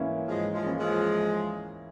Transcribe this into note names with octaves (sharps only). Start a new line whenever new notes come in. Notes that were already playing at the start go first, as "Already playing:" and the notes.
Already playing: G#2 E3 A#3 C#4 E4
G#2 F3 G#3
F3 G#3
E3 A#3 C#4 E4
F3 G#3